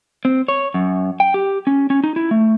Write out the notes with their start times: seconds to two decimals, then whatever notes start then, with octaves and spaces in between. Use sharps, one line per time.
0.25 C4
0.48 C#5
0.74 F#2
1.20 G5
1.34 G4
1.67 C#4
1.90 C#4
2.04 D#4
2.16 E4
2.31 A3